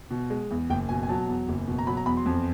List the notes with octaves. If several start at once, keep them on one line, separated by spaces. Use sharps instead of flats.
B2
G#3
E2
F#1 G5
B2 G#5
G#5
F#3 A5
E2
F#1
B2
A#5
F#3 B5
A#5
E2 B5
C6
F2